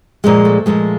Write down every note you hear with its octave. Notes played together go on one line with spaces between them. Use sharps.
A#2 F3 G#3
A3
A#2 F3 G#3